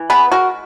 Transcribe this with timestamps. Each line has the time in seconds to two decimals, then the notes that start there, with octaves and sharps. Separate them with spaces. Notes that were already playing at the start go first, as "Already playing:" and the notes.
Already playing: E3
0.10 B3 G#4 B4
0.32 G#3 F#4 A#4